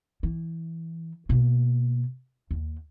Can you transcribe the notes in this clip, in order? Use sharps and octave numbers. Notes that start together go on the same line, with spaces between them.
E3
B2 A#3
D#2